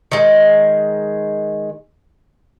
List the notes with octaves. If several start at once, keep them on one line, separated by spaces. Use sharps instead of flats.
D#3 G#3